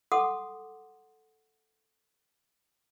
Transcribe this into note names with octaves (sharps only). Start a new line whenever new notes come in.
A4 F#5 C6 D6 D#6